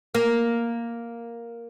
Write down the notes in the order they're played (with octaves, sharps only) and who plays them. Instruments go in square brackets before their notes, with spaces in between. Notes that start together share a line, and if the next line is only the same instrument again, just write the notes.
[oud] A#3